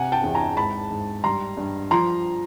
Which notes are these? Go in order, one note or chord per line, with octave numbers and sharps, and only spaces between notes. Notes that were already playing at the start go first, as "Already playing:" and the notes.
Already playing: C3 F#5 G#5
G5 A5
E2
G#5 A#5
G#2 A5 B5
G#2
G3 A#5 C6
G2
F3 A#5 C6